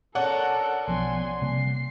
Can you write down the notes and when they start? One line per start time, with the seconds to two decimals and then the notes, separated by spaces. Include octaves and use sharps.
0.15 C#4 D4 A4 A#4 F#5
0.88 B1 F3 B3 G#5 C6
1.42 C3 G3 A#3 C7